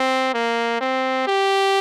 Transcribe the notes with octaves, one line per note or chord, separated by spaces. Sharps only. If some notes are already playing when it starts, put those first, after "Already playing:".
Already playing: C4
A#3
C4
G4